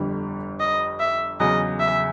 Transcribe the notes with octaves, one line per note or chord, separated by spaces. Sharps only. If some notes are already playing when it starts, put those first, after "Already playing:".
Already playing: G1 F2 D3 G3
D#5
E5
E2 C#3 F#3 D#5
E5